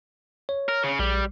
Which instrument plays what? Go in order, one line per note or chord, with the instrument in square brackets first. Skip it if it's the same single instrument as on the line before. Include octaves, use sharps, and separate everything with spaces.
[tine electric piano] C#5
[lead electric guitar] A#4
C#3
[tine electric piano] A#1 [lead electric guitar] G3